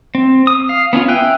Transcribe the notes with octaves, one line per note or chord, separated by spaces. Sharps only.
C4
D#6
F5
B3 C#4 D4 F4
E5 G5 G#5 F#6